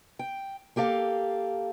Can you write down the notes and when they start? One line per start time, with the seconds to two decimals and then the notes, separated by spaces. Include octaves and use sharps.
0.19 G5
0.76 A#3 G4 A4 F5